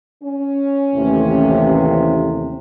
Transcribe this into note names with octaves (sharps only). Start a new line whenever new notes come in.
C#4
A1 D#2 C3